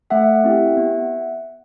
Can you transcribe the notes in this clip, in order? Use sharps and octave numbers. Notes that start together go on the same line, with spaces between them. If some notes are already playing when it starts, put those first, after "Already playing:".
A3 E5 F#5
C4 E4 G4
B3